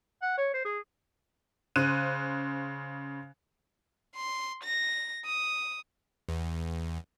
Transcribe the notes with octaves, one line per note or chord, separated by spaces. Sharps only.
F#5
C#5
C5
G#4
C#3 C5 F#6 D#7
C6
A#6
D#6
E2